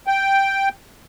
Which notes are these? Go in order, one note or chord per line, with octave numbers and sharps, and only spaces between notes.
G5